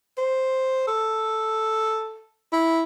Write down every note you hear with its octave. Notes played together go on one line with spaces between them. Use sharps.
C5
A4
E4